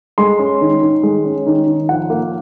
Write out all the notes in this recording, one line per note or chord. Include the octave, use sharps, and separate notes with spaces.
G#3 C6
C#4
D#3
D#3
G#3
C#4
D#3
D#3
F3 F#5
A#3